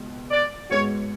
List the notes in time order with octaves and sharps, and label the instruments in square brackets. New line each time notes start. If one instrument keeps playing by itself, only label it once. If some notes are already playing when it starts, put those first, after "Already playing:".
Already playing: [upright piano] C#2 B2
[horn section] D5
[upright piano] G#2 G#3 B3 F#4 [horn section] C#5